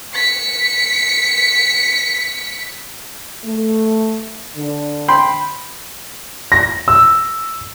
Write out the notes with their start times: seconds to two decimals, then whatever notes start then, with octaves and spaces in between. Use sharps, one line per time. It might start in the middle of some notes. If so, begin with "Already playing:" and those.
0.15 B6 C#7
3.44 A3
4.55 D3
5.08 G5 B5 C6
6.52 A#6
6.88 E6